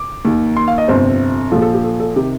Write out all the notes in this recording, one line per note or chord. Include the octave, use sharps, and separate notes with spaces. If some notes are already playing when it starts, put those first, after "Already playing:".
Already playing: D6
D#2 D#3
C6
F5
D#5
G1 F2 C3 C5
A#1 A#2 F3 A4
A4
G4
A4
A4
C3 D#3 G4